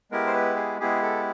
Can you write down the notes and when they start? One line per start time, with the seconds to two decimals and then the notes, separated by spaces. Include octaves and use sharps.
0.11 G#3 B3 E4 G4 A#4
0.27 C5
0.33 B4
0.56 G#4
0.80 G#3 B3 E4 G4 G#4
1.03 A4